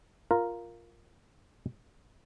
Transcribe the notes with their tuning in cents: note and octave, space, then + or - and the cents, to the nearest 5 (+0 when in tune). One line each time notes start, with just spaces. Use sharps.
F4 +0 A#4 +0